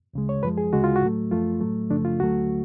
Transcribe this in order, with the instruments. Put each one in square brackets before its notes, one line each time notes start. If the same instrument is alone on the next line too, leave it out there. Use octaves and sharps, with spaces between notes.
[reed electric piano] D2 C#3 G#3
C#5
F#2 F3 G#3 B4
G#4
D2 C#3 G#3 F#4
F4
F#4
A2 F#3 A3
F#2 F3 A3 F4
A2 F#3 A3
F#2 C#3 F3 A3 D4
F4
D2 D3 F#3 A3 F#4